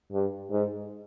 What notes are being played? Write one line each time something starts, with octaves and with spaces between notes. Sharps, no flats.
G2
G#2